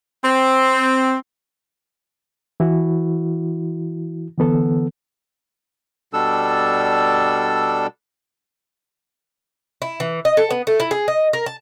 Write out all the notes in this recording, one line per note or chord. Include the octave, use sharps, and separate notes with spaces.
C4
E3 E4 F#4
D3 E3 B3 A4
B2 G3 D4 A4 E6
E4
E3
D#5
A4
B3
A3
E4
G#4
D#5
A#4
A5